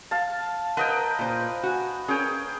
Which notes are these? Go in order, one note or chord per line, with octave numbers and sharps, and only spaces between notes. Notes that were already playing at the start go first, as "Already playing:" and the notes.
F5 A5
A#4 B4 D#5 F#5 G5
A#2 C5
F#4 G#5
C#4 G#4 A#4 G5